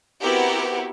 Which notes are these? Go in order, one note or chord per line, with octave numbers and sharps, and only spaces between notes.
B3 C4 E4 F#4 G4 A#4